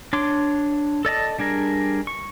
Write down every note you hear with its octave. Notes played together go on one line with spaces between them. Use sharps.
D4 C#5 C6 D6
A4 D5 D#5 A5
G3 D4 G#4 A#4
C#6